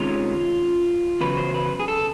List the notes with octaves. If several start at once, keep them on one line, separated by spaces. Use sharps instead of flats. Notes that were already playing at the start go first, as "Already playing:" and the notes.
Already playing: C3 D#3 G#3 C#4 F4
E2 C#3 F#3 B4
C5
B4
G#4
A4